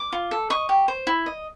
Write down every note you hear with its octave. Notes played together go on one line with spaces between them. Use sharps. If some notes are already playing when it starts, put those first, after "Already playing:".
Already playing: D6
F4
A4
D#5 C#6
G4
C5
E4
D#5